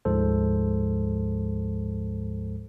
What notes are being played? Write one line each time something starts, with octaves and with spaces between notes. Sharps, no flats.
D2 G#2 F3 G#3 A4 C5